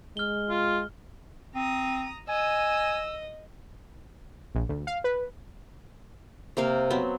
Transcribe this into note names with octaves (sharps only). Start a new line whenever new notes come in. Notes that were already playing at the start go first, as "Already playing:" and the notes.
G#3 F6 G7
F4
C4 A#5 D#6
D#5 G#5 E6
A#1
D2
F5
B4
C3 A#3 A#4 F5
F#3 B3 C4